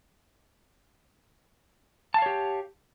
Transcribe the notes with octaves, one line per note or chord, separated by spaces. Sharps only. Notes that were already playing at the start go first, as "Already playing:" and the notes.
G4 C#5 F5 A5